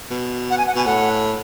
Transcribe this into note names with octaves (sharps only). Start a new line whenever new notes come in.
B2
F#5
G#5
F#5
B2 G#5
A2 F#5